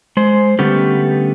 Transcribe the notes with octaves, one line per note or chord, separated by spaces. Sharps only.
G#3 C5
D3 G3 A3 B3 C#4 G4